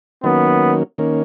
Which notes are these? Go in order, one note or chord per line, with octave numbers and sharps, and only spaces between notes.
D#3 F#3 A#3 B3 C#4
D#3 A#3 C#4